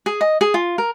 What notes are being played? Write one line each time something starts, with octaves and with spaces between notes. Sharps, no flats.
G#4
D#5
G#4
F4
A#4